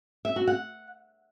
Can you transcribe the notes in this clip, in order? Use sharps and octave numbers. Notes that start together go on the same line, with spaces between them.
E5
F#4
F#5